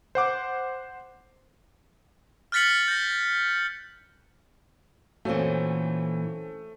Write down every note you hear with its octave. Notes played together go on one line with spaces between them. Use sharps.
C5 F#5 D6
F6 F#6 A6 B6 C#7 F#7
G6 A#6
A#2 E3 A3 C4 C#4 F#4